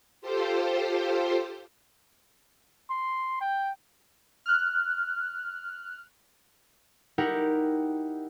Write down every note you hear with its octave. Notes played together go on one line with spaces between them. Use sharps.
F4 G4 A4 C5
C6
G5
F6 F#6
D#4 E4 G4 A#4 F#5